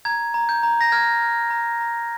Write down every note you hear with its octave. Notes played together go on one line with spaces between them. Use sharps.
A#5 G#6
A#5
G6
A#5
A#6
F6 G#6
F6
A#5
A#5